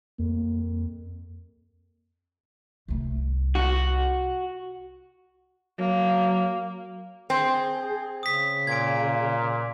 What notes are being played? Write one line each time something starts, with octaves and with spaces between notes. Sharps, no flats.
F2 A#3
C2 A3
F#4
F#3 A#3
C4 G#4
C#3 D#6 B6
A#2 G#6 D7